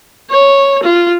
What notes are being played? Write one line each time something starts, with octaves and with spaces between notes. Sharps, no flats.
C#5
F4